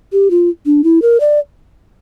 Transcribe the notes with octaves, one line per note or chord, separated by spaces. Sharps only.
G4
F4
D4
E4
A#4
D5